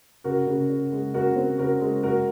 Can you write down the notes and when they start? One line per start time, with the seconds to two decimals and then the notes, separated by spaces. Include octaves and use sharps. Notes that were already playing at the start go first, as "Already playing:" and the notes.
0.24 C#3 F#4 A#4
0.47 C#3
0.69 C#3
0.92 G#3
1.14 C#3 F#4 A#4
1.36 C4
1.58 C#3 F#4 A#4
1.81 G#3
2.03 G#3 F#4 A#4